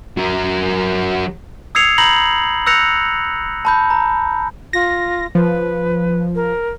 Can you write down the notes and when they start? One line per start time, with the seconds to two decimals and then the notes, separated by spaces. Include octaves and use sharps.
0.17 F#3 A#4
1.75 D#6 E6 G#6 C7 C#7 F7
1.98 A#5 B5 G6 A#6 F#7
2.67 E6 F#6 G6 A#6 C#7 F7
3.65 A5 B5 G6
3.90 A#5
4.73 F4 A#6
5.35 F3 B4
6.35 A#4